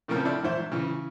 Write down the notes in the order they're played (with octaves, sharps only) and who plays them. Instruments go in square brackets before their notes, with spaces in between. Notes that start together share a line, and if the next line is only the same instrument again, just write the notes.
[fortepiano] A2 C#3 F3 A#3 C4 A4
F3 C4 D4 E4
E2 G#2 C5 E5
C#3 E3